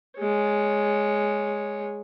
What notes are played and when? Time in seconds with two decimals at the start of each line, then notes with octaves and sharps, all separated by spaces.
0.18 G#3 C#5